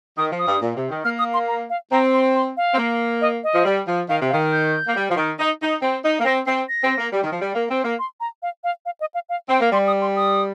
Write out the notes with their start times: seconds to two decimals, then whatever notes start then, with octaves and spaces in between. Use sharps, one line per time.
0.18 D#3 D#6
0.32 F3
0.39 D#6
0.47 G2
0.62 A#2
0.76 C3
0.90 D#3
1.04 A#3 F6
1.19 D#6
1.34 C6
1.48 A#5
1.70 F5
1.91 C4 A#5
2.14 C6
2.35 C6
2.57 F5
2.74 C4
2.78 A#3
3.21 D#5
3.43 D#5
3.54 F3
3.65 G3
3.87 F3
4.09 D#3 F5
4.21 C3
4.30 F5
4.33 D#3
4.52 G6
4.87 A#3
4.96 G3
5.10 F3
5.16 D#3
5.39 D#4
5.62 D#4
5.82 C4
6.04 D#4
6.20 A#3
6.25 C4 A#6
6.47 C4 C7
6.69 A#6
6.83 C4
6.98 A#3
7.12 G3
7.23 D#3
7.32 F3
7.41 G3
7.55 A#3
7.69 C4
7.84 A#3
7.99 C6
8.20 A#5
8.42 F5
8.64 F5
8.85 F5
9.00 D#5
9.14 F5
9.29 F5
9.49 C4 G5
9.60 A#3
9.72 G3 C6
9.87 D#6
10.02 C6
10.16 D#6